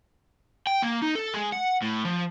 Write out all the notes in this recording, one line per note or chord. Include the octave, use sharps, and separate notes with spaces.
G5
A#3
D#4
A4
G#3
F#5
A2
F3